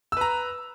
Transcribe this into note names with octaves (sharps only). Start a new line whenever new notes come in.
B4 A#5 E6